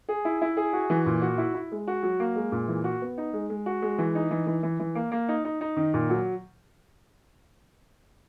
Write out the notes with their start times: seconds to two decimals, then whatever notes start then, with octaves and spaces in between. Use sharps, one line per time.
0.09 G#4
0.25 E4
0.42 E4
0.57 G#4
0.73 F#4
0.90 E3
1.06 A#2
1.22 F#4
1.38 E4
1.54 E4
1.72 G#3
1.88 F#4
2.03 F#3
2.20 A#3
2.36 G#3
2.52 A#2
2.68 E3
2.84 F#4
3.02 B3
3.18 D#4
3.33 G#3
3.50 G#3
3.66 F#4
3.82 G#3
3.99 E3
4.15 D#4
4.31 E3
4.47 E3
4.63 E3
4.80 E3
4.95 A#3
5.12 A#3
5.28 D#4
5.45 D#4
5.61 D#4
5.77 D#3
5.94 A#2
6.10 F#3